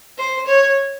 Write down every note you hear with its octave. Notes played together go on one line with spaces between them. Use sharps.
C5
C#5